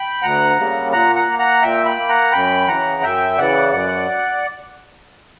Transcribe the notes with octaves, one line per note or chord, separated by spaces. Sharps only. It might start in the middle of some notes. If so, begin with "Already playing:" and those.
Already playing: G5 B5
D2 F#5 A#5
C#3 G3 A#3
A#2 F#5 A#5
F#5 A#5
A#3
F#5 A#5
A#2 E5 G5
G5 B5
A#3
F#5 A#5
F#2 G5 B5
C#3 E3 F#5 A#5
F#2 E5 G5
C#3 E3 D5 F#5
F#2 D5 F#5